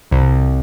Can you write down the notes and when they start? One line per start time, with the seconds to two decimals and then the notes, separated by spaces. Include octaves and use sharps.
0.11 C2